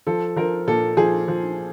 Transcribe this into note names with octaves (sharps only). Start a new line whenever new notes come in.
F3 A4
F3 A#4
A#2 A4
F3 G#4
F3